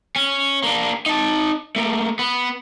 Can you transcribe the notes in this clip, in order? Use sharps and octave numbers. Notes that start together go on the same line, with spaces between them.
C#4
A#3 D4
D#4 A5
A3 A#3
B3